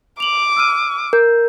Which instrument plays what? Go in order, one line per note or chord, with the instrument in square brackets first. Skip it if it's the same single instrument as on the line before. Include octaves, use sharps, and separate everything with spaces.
[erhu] D6 [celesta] F7 F#7
[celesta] E6 F6 D#7
[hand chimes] A#4 [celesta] G6